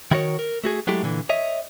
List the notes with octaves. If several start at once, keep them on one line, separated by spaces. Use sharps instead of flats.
D#3 E4 F#4 A#4 C#5
A#4
A3 F#4 G#4
F#3 G#3 A3 E4 G4
A#2 D3 E3
C#5 D#5 E5